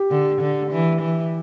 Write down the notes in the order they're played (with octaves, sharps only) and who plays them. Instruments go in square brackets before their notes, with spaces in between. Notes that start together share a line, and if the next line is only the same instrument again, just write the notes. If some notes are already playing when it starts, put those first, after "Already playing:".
Already playing: [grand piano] G4
[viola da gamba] D3
D3
E3
E3